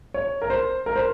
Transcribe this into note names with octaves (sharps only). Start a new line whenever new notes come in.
C#5
A#4
C5
A#4
C5